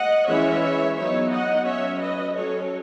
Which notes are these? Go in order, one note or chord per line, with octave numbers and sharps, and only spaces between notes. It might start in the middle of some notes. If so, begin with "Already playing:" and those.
Already playing: D#5 F#5
E3 G#3 C#4 C#5 E5
F#3 B3 D#4 C#5 E5
D#5 F#5
F#3 C#4 C#5 E5
B4 D#5
F#3 C#4 A4 C#5